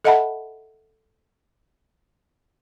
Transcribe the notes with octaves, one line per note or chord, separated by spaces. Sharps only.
A4 D#5 E5 F#5 A5 B5